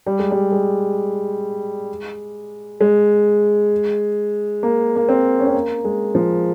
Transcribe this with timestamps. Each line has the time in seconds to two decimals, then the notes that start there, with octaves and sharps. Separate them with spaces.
0.06 G3
0.19 G#3
0.31 G3
0.52 G#3
2.81 G#3
4.63 A#3
4.96 A#3
5.09 C4
5.40 C#4
5.47 C4
5.54 A#3
5.85 G#3
6.15 F3